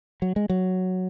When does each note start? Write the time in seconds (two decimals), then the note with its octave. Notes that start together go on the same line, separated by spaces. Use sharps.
0.22 F#3
0.36 G#3
0.49 F#3